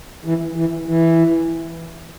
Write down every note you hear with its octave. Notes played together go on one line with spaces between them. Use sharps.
E3
E3
E3